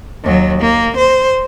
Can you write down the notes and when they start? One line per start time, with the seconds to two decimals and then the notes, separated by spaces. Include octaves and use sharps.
0.24 D#2 F#3
0.61 A#3
0.97 C5